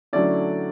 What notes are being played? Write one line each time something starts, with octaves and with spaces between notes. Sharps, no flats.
D3 F#3 A3 C#4 E4 D5